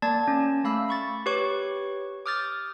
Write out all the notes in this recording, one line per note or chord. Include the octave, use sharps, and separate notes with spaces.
A#3 D5 A5 G#6 A6
C#4
A3 F5 B5 E6
B5 C#6 A6
G4 B4 C#5 C#6 D6
D6 D#6 F6 G6 A6